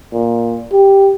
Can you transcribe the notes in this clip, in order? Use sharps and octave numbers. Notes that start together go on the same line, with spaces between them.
A#2
G4